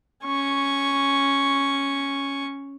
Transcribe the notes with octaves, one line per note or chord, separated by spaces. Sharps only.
C#4 C#6